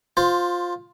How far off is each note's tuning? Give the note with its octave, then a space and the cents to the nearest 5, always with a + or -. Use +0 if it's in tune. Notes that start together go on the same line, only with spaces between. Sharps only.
F4 +15 C5 +0